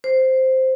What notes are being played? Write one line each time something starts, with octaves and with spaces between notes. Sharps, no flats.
C5